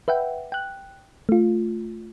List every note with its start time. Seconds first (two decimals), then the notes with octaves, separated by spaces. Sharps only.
0.08 B4 E5 F#5 G5
0.52 G5 F#6
1.29 A3 F4